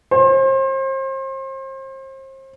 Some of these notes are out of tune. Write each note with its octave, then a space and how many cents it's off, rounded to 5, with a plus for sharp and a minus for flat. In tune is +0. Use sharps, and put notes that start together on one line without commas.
C5 +35